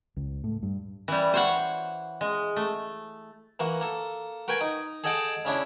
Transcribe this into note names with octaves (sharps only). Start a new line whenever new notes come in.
C#2
A2
G2
E3 G3
C5 C#5 F#5
G#3
A3
E3 A#3 F#4
A#3 A4
F#4 A#4 B4 G5 G#5
D#4
G#4 A4 D#5 F#5 G5 A5
C#3 C#4 D4 E4